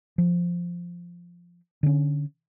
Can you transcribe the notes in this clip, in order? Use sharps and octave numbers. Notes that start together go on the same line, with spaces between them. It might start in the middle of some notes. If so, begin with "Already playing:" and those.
F3
D3 C#4